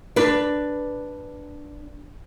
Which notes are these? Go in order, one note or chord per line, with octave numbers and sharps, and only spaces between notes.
D4 B4